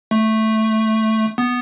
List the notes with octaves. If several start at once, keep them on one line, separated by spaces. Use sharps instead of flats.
A3
B3